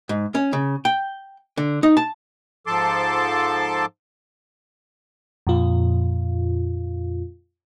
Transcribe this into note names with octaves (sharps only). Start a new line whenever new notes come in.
G#2
C#4
C#3
G5
D3
D#4
A5
G#2 F3 A4 A5 C6 D6
F2 A#2 F4